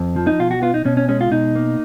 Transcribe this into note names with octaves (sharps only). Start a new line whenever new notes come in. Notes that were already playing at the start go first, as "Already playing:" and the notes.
Already playing: F2
F3
D#4
B2 F4
F#4
B3 F4
D#4
B2 C#4
C#4
G#3 C#4
F4
B2 D#4
A#3